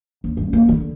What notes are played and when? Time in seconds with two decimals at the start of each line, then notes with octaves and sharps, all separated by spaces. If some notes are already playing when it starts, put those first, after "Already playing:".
0.24 D#2
0.37 G2
0.53 A#3
0.69 D3